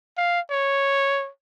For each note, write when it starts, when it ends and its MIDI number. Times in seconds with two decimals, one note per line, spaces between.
0.17 0.40 77
0.51 1.29 73